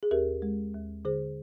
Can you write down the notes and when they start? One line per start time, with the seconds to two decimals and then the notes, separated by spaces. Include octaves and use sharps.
0.03 G#4
0.11 D#2 G4 A#4
0.42 G#3
0.74 D#2
1.05 D3 G#4 C5